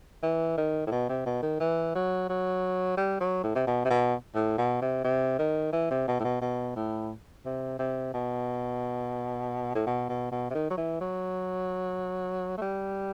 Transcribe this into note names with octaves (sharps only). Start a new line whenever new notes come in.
E3
D#3
A2
B2
C3
B2
D#3
E3
F#3
F#3
G3
F#3
A2
C3
B2
C3
B2
A2
B2
C3
C3
D#3
E3
C3
B2
A2
B2
B2
A2
C3
C3
B2
A2
B2
B2
B2
C3
D#3
F#3
E3
F#3
A3
G3